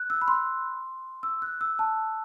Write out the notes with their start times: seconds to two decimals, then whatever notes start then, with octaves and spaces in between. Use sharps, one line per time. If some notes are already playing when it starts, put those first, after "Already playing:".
Already playing: F#6
0.10 E6
0.22 B5
0.28 C6
1.23 E6
1.42 F#6
1.61 E6
1.79 A5